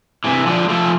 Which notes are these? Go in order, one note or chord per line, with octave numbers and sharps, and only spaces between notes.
C3 E3
D3 F3
F3 A3